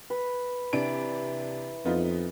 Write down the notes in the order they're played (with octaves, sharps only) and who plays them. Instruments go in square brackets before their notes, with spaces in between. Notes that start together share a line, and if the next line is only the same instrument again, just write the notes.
[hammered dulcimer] B4
[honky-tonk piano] C3 D4 D7 [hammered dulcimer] E3
[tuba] F2 [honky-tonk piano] B3 D#4 F4